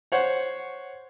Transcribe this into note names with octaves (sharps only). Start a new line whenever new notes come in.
C5 C#5 F#5